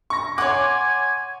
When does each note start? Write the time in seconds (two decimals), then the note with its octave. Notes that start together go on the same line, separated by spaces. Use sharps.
0.10 C#6 A#6
0.38 C#5 F#5 G#5 C6 D6